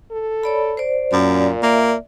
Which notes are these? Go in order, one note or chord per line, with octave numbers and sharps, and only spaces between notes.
A4
C#5 D5 B5
C5 D5
F#2 A#2 D5
A#3 D5 E5